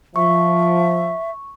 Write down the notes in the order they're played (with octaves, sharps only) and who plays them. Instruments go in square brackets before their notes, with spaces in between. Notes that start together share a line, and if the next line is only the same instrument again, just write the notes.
[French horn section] F3 [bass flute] E5 [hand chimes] C#6